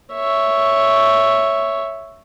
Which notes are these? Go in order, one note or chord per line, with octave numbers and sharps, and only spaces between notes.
C#5 E5